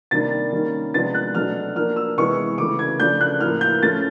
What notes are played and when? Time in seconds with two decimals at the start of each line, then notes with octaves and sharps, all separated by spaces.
0.11 C3 D#3 G3 A#3 D4 A6
0.52 D#3 G3 A#3 C#4
0.94 C3 F3 G#3 B3 D4 A6
1.15 F#6
1.35 B2 F#3 A3 D4 F6
1.76 F3 A#3 D4 F6
1.96 E6
2.17 C3 E3 G#3 B3 C#6
2.58 C#3 E3 A3 D6
2.79 G#6
2.99 C#3 F3 A3 D4 G6
3.21 F#6
3.40 A2 F3 A#3 F6
3.61 G6
3.83 F3 A3 C#4 A6